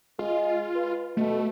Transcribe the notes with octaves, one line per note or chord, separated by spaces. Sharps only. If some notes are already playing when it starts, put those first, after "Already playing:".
G#3 F4
B4
B2 A3